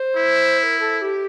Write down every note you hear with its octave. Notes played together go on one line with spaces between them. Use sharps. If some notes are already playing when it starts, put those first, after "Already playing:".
Already playing: C5
E4
C5
A#4
A4
G4